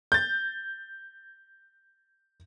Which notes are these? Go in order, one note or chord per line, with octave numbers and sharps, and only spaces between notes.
G6 A6